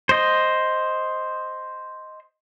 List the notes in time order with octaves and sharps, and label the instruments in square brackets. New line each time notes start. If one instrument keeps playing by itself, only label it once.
[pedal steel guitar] C5 D#5